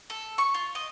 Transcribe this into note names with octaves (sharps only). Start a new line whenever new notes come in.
A4
C#6
F4
D#5